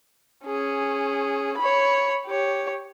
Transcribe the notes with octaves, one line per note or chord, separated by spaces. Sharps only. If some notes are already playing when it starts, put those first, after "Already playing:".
C#4 G#4
C#5 B5
G4 C#5